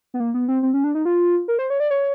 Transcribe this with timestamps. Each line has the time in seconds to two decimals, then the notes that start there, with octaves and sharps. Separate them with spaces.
0.14 B3
0.20 A#3
0.34 B3
0.48 C4
0.63 C4
0.74 C#4
0.84 D4
0.95 D#4
1.05 F4
1.48 A#4
1.59 C5
1.70 C#5
1.80 D5
1.91 C#5